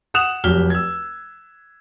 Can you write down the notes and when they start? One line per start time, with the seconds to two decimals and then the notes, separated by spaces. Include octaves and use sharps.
0.14 F#5 D#6 F#6 E7 F7
0.44 F1 F#3 G4 F6 G7
0.70 E6 G#6